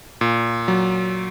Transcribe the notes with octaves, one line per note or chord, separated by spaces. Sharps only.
A#2
F#3